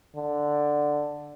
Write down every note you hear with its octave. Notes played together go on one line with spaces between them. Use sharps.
D3